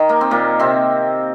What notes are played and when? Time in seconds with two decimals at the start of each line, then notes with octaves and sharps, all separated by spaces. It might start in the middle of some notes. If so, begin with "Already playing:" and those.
Already playing: D#3
0.09 A#3
0.21 C4
0.31 A#2 A#3
0.60 C3 C4